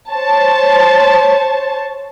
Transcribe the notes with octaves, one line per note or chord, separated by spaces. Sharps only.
C5 C#5 A5